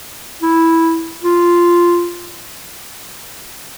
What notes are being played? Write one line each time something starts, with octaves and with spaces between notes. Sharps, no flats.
E4
F4